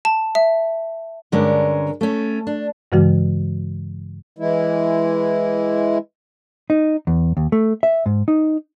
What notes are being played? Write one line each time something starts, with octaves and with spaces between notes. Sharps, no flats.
A5
E5
G2 D3 G#3 C#4 A#4
A3 C#4
D4
G2 C#3 E3 G#3 F#4
E3 G#3 E4
D#4
E2
D#2
A3
E5
G#2
D#4